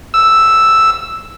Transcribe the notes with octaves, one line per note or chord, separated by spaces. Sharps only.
E6